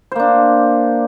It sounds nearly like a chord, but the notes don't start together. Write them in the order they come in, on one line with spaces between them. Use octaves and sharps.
C5 A#3 D4